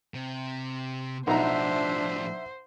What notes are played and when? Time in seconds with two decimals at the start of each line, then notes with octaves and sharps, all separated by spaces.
0.14 C3
1.27 B1 A2 F3 D4 D#4 C5 E5 A#5